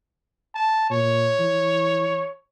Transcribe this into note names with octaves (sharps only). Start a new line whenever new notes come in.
A5
A#2 C#5
E3